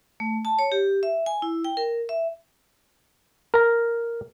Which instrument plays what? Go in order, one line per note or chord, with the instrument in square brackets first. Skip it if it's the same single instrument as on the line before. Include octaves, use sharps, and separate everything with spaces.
[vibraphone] A3
A5
C#5
G4
E5
G#5
E4
G5
A#4
E5
[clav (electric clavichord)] A#4 A#5